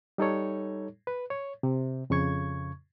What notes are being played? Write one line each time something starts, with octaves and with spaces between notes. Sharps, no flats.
G3 D#4 A4 C#5
B4
C#5
C3
F2 C#3 C#6 G#6